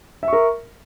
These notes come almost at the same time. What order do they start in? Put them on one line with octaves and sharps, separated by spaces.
E5 C#6 A#4